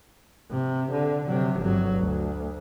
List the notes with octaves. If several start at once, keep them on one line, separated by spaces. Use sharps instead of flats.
C3
D3
C3 F#3
G1 F#3
D2